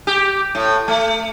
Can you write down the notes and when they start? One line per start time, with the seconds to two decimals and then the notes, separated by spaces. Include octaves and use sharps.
0.07 G4
0.55 A2
0.88 A3